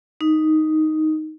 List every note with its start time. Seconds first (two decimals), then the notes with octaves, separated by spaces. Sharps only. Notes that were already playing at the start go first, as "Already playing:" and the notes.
0.21 D#4